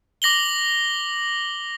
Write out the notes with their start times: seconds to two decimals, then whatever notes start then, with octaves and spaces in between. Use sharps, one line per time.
0.22 D6 A#6 F#7 G7